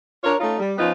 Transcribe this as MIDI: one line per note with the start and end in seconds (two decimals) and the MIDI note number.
0.24 0.34 62
0.24 0.34 65
0.24 0.34 70
0.24 0.34 73
0.40 0.57 57
0.40 0.57 61
0.40 0.57 63
0.40 0.57 65
0.59 0.74 55
0.78 0.92 53
0.78 0.92 59
0.78 0.92 61
0.78 0.92 63
0.78 0.92 65